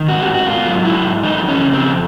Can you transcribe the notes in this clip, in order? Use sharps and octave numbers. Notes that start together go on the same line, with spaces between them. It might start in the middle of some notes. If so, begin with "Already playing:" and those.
Already playing: D#3
G#2 F#4
G4
G#2
F#4
G#2 F4
F#3
G#2 E4
G#2
E3 D#4
F2
C#4
C#3
C4
F2